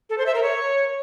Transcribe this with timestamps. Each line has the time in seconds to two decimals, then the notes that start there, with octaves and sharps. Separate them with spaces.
0.10 A4
0.18 C5
0.26 E5
0.35 A#4
0.43 C#5